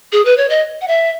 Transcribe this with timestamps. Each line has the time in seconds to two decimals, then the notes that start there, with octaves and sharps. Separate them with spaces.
0.12 G#4
0.25 B4
0.37 C#5
0.50 D#5
0.81 F#5
0.88 E5